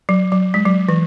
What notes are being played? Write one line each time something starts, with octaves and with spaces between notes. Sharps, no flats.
F#3
F#3
G#3
F#3
E3